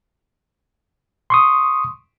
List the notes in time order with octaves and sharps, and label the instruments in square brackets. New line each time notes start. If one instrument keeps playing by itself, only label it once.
[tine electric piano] C6 C#6 D#6